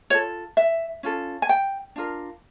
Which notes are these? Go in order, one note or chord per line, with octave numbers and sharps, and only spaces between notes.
F4 A4 C#5
E5
C#4 F4 A4
G#5
G5
D4 F4 A#4